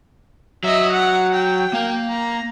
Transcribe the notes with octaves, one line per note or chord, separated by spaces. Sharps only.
F#3 D#5 E5
F#5
G5
A#3 F5
A#5